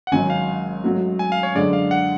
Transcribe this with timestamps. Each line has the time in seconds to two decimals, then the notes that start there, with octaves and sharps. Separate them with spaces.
0.07 F#5
0.12 G#1 G#2 F#3 C#4 G#5
0.30 F5
0.84 G#2 F#3 A3 C#4 F#4
1.19 G#5
1.32 F5
1.43 C#5
1.55 F#2 D3 G#3 D5
1.73 F5
1.91 F#5